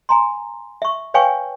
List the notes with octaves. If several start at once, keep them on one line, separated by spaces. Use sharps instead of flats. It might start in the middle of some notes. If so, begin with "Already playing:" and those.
G#5 A#5 C6
E5 C#6
B4 C#5 F5 G5 G#5 C#6